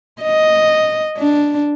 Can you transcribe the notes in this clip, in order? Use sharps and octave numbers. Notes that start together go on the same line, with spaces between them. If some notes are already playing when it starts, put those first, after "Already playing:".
D#5
D4